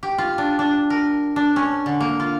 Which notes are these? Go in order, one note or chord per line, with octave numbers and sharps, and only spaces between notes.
G4
F4
D4
D4
A#4
D4
C#4
D3
A#3
F4